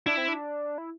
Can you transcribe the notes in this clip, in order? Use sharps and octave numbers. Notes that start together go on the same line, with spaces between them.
D4 E4
C4
D4
E4